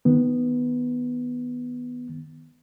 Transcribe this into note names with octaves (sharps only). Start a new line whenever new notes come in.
D#3 B3